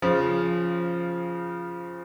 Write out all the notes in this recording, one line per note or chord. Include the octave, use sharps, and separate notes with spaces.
C#3 F3